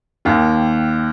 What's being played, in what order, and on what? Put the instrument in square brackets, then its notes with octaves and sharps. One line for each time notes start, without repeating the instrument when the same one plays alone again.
[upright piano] D#2 D#3